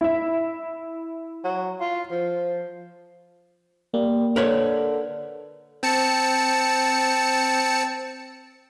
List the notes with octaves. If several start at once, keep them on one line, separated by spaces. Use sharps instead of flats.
E4 E5
F#3
F4
F3
G3 A#3
D3 A#4 B4 C#5
C4 A5 C#7